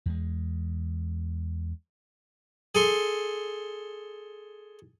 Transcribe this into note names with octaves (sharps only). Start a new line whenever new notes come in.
E2 G#3
G#4 A4 C6